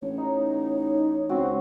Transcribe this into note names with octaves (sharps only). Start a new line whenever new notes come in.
A1 C#5
D#4
C#2 C4 F#4